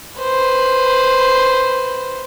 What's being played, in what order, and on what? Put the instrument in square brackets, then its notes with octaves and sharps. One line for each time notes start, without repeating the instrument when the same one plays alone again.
[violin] B4 C5